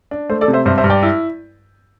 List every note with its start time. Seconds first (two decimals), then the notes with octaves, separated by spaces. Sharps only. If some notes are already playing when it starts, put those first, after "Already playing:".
0.11 D4
0.29 A3 C5
0.41 A4 D5
0.48 C3
0.53 C5 E5
0.66 G2 C5 E5
0.78 C5 E5
0.84 G2
0.90 D5 G5
1.03 E4